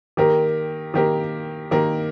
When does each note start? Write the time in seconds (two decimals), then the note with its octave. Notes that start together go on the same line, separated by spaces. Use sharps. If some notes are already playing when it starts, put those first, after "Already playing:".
0.17 D#3 A#3 G4 A#4
0.94 D#3 A#3 G4 A#4
1.71 D#3 A#3 G4 A#4